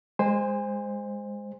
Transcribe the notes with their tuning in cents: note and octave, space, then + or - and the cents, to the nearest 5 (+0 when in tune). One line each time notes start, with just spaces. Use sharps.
G#3 -10 C5 +0 G#5 -35